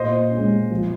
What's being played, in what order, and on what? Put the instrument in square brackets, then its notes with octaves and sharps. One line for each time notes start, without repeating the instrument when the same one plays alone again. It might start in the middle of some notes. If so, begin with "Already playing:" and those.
Already playing: [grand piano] A#2 C5 D#5
G#3 C#4
F3